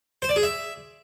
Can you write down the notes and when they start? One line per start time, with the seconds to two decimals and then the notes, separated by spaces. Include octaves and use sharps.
0.22 C5
0.29 D5
0.36 G#4
0.43 E5